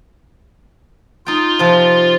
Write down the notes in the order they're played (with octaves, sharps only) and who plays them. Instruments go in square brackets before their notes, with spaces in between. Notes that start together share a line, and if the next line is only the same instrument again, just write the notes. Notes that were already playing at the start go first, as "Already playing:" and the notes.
[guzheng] D#4 G5 [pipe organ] F4
[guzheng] C3 F3